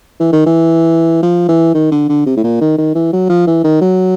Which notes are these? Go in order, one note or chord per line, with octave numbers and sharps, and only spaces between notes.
E3
D#3
E3
F3
E3
D#3
D3
D3
C3
A2
A#2
D#3
D#3
E3
F#3
F3
E3
D#3
F#3